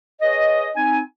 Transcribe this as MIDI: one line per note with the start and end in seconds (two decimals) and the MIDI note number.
0.22 0.70 68
0.22 0.70 71
0.22 0.70 73
0.22 0.70 75
0.76 1.00 60
0.76 1.00 63
0.76 1.00 80